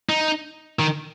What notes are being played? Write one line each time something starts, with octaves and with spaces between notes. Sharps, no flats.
D#4
D#3